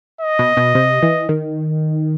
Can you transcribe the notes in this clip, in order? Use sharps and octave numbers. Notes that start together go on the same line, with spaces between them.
D#5
B2
B2
C3
E3
D#3